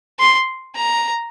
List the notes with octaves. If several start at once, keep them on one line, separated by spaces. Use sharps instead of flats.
C6
A#5